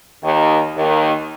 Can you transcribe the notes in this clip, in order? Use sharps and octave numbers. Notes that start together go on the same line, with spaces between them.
D#2 D#3
D#2 D#3